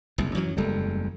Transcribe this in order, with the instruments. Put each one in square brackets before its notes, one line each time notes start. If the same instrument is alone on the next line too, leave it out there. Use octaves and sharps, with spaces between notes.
[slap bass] F#1 C2 F2
F#2 E3 F#3
[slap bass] F#1 E2 [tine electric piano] G3 G#3 A4